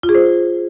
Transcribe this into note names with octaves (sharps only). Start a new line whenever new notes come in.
F4
G#4
C5